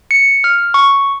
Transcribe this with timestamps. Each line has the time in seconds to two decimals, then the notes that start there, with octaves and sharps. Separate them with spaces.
0.11 C#7
0.44 F6
0.74 C#6